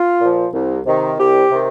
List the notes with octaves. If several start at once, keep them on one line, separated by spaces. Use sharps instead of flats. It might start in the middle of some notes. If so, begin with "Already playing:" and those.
Already playing: F4
A#2 F3
C2
C3 D#3
C2 G4
C3 D#3